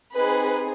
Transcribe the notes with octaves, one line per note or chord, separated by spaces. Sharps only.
C4 D#4 G#4 B4